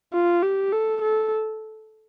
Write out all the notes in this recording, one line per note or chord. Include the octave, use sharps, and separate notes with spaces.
F4
G4
A4
A4